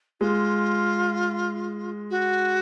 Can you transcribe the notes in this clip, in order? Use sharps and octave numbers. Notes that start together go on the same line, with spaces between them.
G#3 F4
F#4